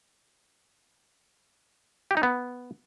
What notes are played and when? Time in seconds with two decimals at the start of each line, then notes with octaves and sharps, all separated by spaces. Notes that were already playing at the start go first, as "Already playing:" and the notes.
2.11 G4
2.17 D#4
2.23 B3